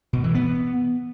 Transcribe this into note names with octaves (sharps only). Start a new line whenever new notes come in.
B2
E3
B3